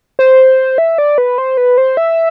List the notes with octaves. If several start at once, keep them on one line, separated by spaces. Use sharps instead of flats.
C5
E5
D5
B4
C5
B4
C5
E5